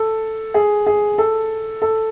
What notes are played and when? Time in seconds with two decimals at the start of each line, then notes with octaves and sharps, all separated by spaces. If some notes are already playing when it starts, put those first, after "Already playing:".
Already playing: A4
0.54 G#4
0.87 G#4
1.18 A4
1.82 A4